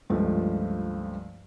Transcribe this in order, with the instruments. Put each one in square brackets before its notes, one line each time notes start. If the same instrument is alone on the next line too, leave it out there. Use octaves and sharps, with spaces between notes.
[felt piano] C#2 G2 F3 A3